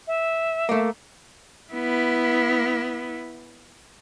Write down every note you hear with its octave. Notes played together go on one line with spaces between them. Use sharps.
E5
A3 A#3
B3 E4